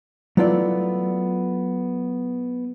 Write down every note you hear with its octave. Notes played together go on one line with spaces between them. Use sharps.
F#3 A3 B3 E4 F4 D5